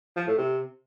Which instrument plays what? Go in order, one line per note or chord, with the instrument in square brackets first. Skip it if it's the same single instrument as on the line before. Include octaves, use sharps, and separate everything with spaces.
[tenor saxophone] F3
A2
C3